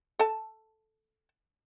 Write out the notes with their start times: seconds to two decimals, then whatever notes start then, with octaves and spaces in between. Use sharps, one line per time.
0.19 A4 A5